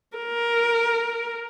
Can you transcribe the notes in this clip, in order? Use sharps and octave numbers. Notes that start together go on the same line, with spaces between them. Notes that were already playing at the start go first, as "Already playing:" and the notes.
A#4